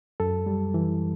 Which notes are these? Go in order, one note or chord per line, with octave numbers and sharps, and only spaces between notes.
F#2 A4
G3
E3